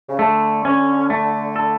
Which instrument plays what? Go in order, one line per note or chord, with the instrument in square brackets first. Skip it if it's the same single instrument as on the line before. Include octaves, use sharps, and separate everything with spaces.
[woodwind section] C#3
[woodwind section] D3 [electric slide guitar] A3
[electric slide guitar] C#4
A3
A4